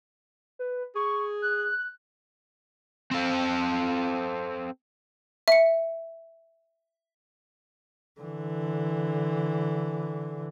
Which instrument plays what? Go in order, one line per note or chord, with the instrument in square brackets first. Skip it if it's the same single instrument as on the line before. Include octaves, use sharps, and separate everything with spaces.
[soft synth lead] B4
[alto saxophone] G#4 [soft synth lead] C#6
[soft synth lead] F#6
[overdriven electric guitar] C4 A4
[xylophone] E5 C#7
[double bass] D3 E3